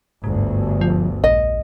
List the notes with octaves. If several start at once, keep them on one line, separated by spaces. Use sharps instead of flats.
G1 D2 G#2
F3
A#1 D#5